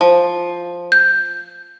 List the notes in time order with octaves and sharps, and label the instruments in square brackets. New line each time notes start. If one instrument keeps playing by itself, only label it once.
[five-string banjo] F3
[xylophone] G6